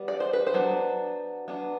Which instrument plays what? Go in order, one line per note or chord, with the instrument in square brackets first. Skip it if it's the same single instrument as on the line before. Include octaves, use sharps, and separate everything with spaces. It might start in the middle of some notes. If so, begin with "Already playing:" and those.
Already playing: [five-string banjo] G3 B3
D5
C5
B4
C5
F#3 B3 D4
F#3 B3 D4